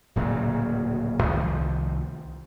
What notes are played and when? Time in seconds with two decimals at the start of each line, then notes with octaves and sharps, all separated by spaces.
0.16 D1 A#2 C#3 F#3
1.23 C2 D#3 F3